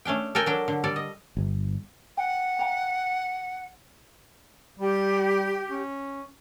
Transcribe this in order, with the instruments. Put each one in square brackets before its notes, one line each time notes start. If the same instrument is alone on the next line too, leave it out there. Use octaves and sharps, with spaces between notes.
[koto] A3 C#4 D4 G5
A4 A#4 G5 G#5
F#3 D4 G5
D3
G3 A4 D5
D#5
[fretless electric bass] G1
[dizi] F#5 [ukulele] G5
[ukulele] F5 G5 A#5
[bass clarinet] G3 [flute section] G4
[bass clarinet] C#4